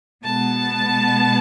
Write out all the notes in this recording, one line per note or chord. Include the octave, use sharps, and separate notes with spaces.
B2 G#3 B3 A5